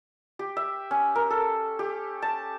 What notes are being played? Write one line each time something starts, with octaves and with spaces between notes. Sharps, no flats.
G4
E5
C#4
A#4
A4
G4
A5